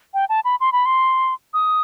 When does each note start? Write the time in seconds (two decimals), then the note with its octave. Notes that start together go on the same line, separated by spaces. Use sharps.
0.14 G5
0.29 A5
0.45 B5
0.60 C6
0.72 B5
0.86 C6
1.54 D#6